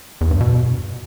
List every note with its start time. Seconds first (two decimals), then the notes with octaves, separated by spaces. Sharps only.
0.21 E2
0.31 G2
0.41 B2